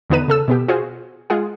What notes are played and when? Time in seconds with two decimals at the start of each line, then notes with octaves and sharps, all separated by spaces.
0.10 E2 D3 B3 D#4 B4 D#7
0.28 C#3 A4 E6
0.48 B2 B3 G4
0.68 F4 F#4 G#4 C5
1.30 G#3 F4 G#4 F#5